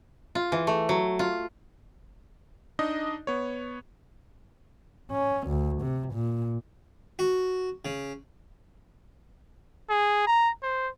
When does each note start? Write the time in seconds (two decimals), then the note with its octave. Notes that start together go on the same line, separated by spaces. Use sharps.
0.35 F4
0.52 E3
0.67 A3
0.89 F#3
1.19 F4
2.79 D4 D#4 D#5
3.27 B3 C#5
5.12 C#4
5.48 D2
5.82 C3
6.14 A#2
7.19 F#4
7.85 C#3
9.89 G#4
10.27 A#5
10.63 C5